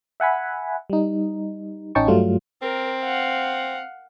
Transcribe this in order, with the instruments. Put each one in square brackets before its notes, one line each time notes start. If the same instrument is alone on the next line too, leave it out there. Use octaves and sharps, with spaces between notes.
[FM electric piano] E5 F#5 G#5 B5
G3 D#4
A1 C#4 D#4 G5 A5 C#6
G2 F#3 G3 A3 F4
[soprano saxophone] C4 [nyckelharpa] A#4
[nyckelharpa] F5 F#5